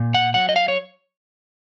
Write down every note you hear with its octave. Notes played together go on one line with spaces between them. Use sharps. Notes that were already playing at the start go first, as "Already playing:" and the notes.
Already playing: A#2
F#5
F#3 F#5
D#5
F5
C#5